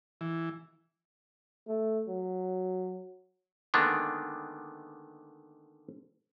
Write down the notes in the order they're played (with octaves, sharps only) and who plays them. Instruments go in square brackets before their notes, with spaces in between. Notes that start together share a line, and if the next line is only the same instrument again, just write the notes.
[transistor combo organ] E3
[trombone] A3
F#3
[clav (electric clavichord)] D3 D#3 G#3 A#3 B3 D4